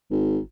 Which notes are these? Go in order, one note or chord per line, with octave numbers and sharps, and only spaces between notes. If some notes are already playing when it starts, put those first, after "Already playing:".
G#1